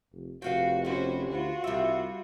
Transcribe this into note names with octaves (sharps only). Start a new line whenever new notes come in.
F1
F1 F#4 B4 F5 G5
C#4 F#4 G4 B4 C5
D2 F4 F#4
C2 G3 E5